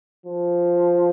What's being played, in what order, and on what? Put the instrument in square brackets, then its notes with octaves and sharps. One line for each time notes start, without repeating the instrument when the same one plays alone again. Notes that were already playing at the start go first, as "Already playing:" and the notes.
[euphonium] F3